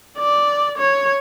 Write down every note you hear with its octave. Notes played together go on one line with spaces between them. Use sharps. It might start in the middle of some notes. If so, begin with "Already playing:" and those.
D5
C#5